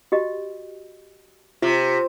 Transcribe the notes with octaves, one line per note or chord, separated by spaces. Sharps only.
F#4 G4 D#5
C3 F4